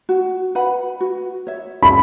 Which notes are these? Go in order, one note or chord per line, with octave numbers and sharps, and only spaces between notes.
F#4
B4 F#5 B5
F#4
C#5 E5
B5